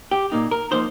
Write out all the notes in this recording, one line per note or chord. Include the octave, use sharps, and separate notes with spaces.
G4
A#2 A#3 D#4
A#4
F3 A#3 D#4 C5